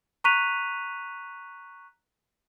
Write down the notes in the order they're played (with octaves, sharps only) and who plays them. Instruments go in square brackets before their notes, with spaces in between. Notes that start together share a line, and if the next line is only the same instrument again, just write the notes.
[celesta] A#5 C#6 F#6 B6 D#7 F7